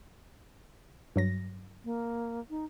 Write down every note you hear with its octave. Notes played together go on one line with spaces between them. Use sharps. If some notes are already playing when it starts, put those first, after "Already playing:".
G2 F#3 A#6
A#3
D#4